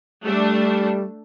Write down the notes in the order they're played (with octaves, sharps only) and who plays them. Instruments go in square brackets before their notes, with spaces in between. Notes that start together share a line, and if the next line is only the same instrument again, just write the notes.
[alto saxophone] G3 [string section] A3 D4